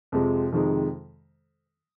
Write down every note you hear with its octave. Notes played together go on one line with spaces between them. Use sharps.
F2 C3 F3 G#3
F2 C3 D#3 G#3